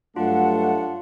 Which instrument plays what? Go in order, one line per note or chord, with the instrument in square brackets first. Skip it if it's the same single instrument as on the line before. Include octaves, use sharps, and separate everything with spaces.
[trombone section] G2 F#3 A3 [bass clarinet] D4 [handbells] F4 [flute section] F#5